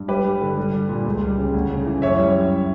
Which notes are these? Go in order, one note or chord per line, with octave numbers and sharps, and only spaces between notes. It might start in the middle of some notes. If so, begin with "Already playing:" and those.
Already playing: G2
G3 G4 B4
G3
D3
G3
G3
A#2
C#2
G3
C#3
D2
C#3
E3
F#2 C#5 E5
G3